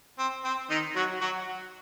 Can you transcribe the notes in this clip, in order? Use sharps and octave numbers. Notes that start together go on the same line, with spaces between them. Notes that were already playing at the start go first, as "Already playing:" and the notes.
C4
C4
D#3 D#4
F#3 F#4
F#3 F#4